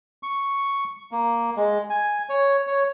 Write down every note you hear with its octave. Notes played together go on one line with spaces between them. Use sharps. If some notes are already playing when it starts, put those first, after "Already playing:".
C#6
A#3
G#3
G#5
C#5
C#5